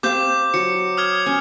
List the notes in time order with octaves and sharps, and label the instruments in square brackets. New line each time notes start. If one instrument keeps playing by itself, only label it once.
[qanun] C4 G4 F5 [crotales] D6 G6
[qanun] F#3 [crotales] C#7
[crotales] D#6 F6 G#6
[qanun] C#4